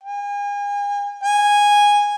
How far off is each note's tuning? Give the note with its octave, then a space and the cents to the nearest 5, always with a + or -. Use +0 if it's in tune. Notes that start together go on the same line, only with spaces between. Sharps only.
G#5 -40
G#5 -10